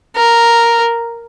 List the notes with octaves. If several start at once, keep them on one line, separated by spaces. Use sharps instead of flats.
A#4